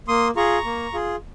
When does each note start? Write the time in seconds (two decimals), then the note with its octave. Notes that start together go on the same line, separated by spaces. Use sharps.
0.08 A#3 C6 D#6
0.36 F4 G#4 A#5 C#6
0.65 A#3
0.93 F4 G#4